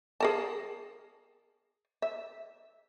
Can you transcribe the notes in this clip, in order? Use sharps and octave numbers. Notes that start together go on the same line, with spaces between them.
G#4 A#4 A5
E5